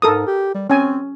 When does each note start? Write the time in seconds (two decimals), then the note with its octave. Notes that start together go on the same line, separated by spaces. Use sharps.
0.02 G#2 A4 A#4 D#6
0.27 G4
0.55 G3
0.70 C4 C#4 G#5